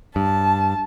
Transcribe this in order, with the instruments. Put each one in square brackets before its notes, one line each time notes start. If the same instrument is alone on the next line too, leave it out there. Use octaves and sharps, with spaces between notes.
[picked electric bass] G2 [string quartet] A5